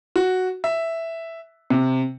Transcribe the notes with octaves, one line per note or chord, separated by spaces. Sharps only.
F#4
E5
C3